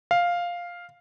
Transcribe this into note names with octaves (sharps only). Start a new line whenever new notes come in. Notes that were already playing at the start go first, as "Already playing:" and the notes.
F5